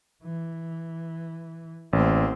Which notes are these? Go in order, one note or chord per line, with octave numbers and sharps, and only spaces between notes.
E3
A1 A#3 C4